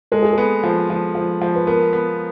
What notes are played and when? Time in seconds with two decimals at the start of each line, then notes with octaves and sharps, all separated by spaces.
0.12 G#3 A4
0.22 G#4
0.33 B3 A4
0.63 F3
0.90 F3
1.15 F3
1.41 F3
1.55 B4
1.67 B3 A#4
1.93 B3